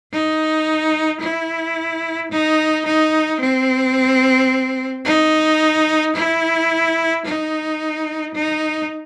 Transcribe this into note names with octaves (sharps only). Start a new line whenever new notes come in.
D#4
E4
D#4
D#4
C4
D#4
E4
D#4
D#4